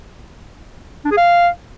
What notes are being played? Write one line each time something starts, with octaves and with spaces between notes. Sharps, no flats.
D4
G#4
F5